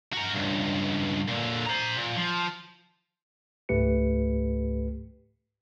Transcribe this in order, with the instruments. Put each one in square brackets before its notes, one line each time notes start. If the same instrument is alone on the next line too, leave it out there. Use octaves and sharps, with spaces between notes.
[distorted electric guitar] F#4 A#4
C#2 G2
A#2 D3
C5 A#5
A#2
F3
[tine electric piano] C#2 G#2 A3 G4 B4 C#7